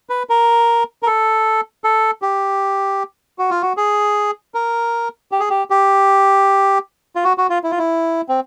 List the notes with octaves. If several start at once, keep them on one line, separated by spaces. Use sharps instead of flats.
B4
A#4
A#4
A4
A4
G4
F#4
F4
F#4
G#4
A#4
G4
G#4
G4
G4
F4
F#4
F#4
F4
E4
F4
E4
C4